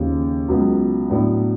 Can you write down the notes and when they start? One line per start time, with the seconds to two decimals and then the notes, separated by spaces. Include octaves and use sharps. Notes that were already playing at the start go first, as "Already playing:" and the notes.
Already playing: D#2 C#3 F3
0.48 C#2 B2 F#3 B3
1.10 A2 F#3 B3 D4